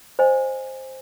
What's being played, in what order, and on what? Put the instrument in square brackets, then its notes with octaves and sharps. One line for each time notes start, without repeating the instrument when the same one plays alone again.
[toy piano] C5 D#5 G#5